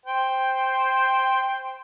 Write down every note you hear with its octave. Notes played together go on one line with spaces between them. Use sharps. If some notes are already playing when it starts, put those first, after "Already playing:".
C5 G5